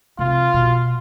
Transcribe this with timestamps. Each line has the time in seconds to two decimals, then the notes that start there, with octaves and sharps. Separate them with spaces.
0.19 C3 F4
0.54 B2